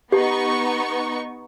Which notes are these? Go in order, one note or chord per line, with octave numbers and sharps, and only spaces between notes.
B3 D#4 G4 C#6